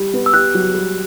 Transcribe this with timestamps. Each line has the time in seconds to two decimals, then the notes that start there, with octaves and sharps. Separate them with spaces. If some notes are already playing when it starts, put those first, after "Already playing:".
Already playing: G3
0.13 B3
0.26 E6
0.34 G4 F#6
0.55 F#3
0.74 G3